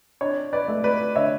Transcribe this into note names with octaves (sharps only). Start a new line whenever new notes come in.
D4 C#5
B4 D5
A3
B4 D5
D3 C#5 E5